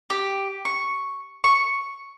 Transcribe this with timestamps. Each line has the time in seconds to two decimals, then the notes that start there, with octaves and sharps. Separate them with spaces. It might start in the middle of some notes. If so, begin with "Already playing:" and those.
0.10 G4
0.65 C#6
1.44 C#6